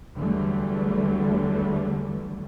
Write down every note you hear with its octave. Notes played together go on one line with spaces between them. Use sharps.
E2 D3 E3 F#3 G3 A3